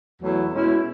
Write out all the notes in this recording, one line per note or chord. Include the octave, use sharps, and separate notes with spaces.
E2 B2 F#3 A3 E4
B2 G#3 C#4 E4